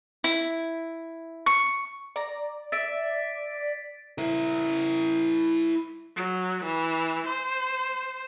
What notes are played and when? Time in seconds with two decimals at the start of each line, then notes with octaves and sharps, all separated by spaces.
0.24 E4
1.46 C#6
2.16 D5 A#5
2.72 E5 A6 B6 D7
4.18 E4 A#4
6.16 F#3
6.64 E3
7.27 C5